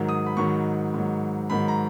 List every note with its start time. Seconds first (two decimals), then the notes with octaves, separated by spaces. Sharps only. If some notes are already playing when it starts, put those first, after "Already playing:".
Already playing: G#2 D#3 F#3
0.09 D#6
0.26 B5
0.37 G#2 D#3 F#3 C#6
0.94 G#2 D#3 F#3
1.50 G#2 D#3 F#3 B5
1.68 A#5